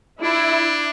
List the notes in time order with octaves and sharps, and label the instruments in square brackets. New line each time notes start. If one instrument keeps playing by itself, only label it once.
[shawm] D4 [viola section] E4